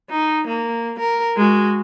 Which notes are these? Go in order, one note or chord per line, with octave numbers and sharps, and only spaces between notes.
D#4
A#3
A#4
G#3 F#4